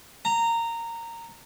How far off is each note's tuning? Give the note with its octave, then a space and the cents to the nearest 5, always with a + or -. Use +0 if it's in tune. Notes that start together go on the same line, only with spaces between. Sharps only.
A#5 -15